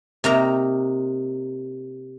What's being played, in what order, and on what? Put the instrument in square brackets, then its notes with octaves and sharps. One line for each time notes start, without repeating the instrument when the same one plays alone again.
[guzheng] C3 A#3 D#4 A#5